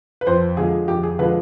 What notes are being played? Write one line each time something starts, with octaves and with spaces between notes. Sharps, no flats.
B4
F2 C5
D3 F3 G#3 G#4
F2 G4
G#4
D3 F3 G#3 B4